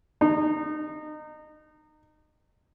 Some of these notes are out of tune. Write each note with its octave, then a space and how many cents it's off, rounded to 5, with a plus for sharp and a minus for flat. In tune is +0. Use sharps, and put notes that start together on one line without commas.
D#4 -25